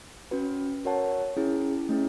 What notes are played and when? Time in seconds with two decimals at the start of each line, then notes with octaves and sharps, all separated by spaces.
0.31 C#4 F#4 B4
0.85 F#4 A#4 C#5 F#5 A5
1.37 C#4 E4 G#4
1.89 A3 C#4 E4 G#4